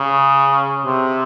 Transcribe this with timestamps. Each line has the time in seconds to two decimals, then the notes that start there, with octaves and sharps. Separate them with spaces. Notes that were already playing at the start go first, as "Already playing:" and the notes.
Already playing: C#3
0.85 C3